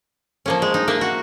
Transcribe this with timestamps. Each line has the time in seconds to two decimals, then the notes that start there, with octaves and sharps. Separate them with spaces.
0.46 F3 A#3 C#4
0.62 G#3
0.74 D#4
0.88 A#3 E5
1.01 F#4